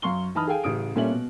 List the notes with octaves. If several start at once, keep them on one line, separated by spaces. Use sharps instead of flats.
F#2 F5 C6 C#6 G7
E3 D#4 A5 B5 D#6 F6
G#4 A4 F5 G5 G#5
A1 C#3 D#6 D7
A#2 G3 C#4 A4 E5 F#7
B2